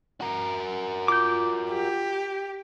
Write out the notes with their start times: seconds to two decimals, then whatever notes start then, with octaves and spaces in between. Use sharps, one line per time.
0.21 F#4 A#4
1.08 F4 D6 G6
1.71 G4